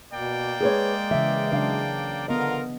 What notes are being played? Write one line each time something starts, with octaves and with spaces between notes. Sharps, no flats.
B2 A#3 D5 G5
G#3 G#4 B4 C#5
C#3 E3 E5
C#3 F#3 D4 F5
D3 B3 F4 A#4 D#5